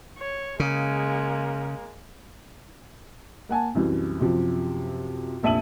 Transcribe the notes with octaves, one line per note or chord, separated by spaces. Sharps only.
C#5
C#3 G#3 A#3
A#3 F#5 G#5 A5
C2 F#2 E3
F#2 C3 F3
F1 A#1 E5 A5 D#7 F#7